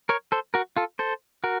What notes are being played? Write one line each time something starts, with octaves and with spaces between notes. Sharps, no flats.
A#4 C#5
A4 C5
F#4 A#4
F4 A4
A4 C5
F#4 A#4